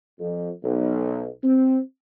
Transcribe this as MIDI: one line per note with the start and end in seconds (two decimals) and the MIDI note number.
0.20 0.49 41
0.64 1.27 35
1.44 1.79 60